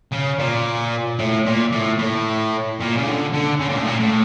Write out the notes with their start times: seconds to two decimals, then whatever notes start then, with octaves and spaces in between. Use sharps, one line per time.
0.12 C#3
0.39 A#2
1.19 A2
1.46 A#2
1.72 A2
1.99 A2
2.80 A#2
2.96 C#3
3.06 D3
3.33 D3
3.60 C#3
3.68 A#2
3.77 A2
3.87 A#2
3.99 A2